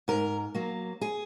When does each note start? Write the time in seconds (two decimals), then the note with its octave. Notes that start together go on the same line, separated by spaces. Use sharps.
0.08 G#2 A#4
0.55 F#3 A#3
1.01 G#4